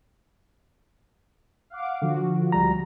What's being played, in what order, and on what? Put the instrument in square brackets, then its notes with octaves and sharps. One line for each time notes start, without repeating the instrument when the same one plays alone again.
[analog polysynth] F5 F#5 D6
[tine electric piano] D3 [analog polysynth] F3 F#4
[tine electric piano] C#2 G3 A#5